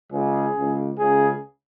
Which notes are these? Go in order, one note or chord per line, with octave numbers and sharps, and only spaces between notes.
C#2 C#3 G#4
C#2 C#3
C#2 C#3 G#4